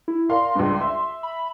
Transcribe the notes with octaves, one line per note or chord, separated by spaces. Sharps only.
E4
A#4 D5 F5 C6
C#2 G2
E5
B5